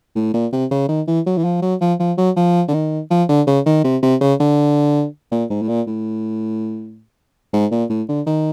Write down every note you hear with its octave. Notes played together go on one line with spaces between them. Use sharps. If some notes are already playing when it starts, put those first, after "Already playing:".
A2
A#2
C3
C#3
D#3
E3
F#3
E3
F3
F#3
F3
F3
F#3
F3
D3
D#3
F3
D3
C#3
D#3
C3
C3
C#3
D3
A#2
G#2
A2
A#2
A2
G#2
A#2
A2
D3
D#3